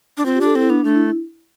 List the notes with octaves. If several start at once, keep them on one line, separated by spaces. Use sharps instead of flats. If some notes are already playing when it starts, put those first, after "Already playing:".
D4
C4 F4
G4
D4 A4
C4 E4
B3 D4
A3 D4
E4